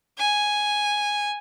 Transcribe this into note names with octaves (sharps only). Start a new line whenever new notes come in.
G#5